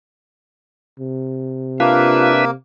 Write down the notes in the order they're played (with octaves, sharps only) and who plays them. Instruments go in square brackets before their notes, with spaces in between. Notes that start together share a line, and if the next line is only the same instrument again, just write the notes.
[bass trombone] C3
[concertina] A#3 [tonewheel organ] D4 B4 E5 [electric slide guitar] F4